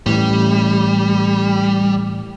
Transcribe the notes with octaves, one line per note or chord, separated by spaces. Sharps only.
A2 E3 G3